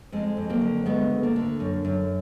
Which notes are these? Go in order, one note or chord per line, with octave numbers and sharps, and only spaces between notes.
F2 G#3
F2
F#3 A#3
D3
D2 G#3 B3
D2
A#3 D4
D3
F#2
F#2